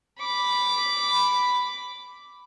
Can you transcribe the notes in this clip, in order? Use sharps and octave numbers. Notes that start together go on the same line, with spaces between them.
B5 D6